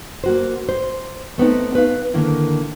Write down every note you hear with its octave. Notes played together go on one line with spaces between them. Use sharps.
A#3 F#4 C5
C5
A3 B3 C4 D#4
B4 F5
D3 D#3 A#3 E4